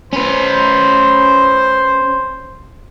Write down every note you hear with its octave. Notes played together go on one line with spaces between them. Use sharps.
C#4 B4 C5